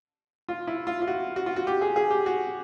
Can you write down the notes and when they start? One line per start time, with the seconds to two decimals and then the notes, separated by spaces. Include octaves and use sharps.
0.49 F4
0.67 E4
0.87 F4
1.02 F4
1.07 F#4
1.36 F#4
1.46 F4
1.56 F#4
1.67 G4
1.81 G#4
1.96 G#4
2.11 G4
2.26 F#4